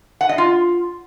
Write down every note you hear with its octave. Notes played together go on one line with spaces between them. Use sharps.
F#5
D#5
F4